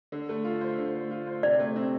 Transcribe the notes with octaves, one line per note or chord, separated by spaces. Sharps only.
D3
A3
F4
C5
D3
A3
F4
C5
C3 D5
A3
C4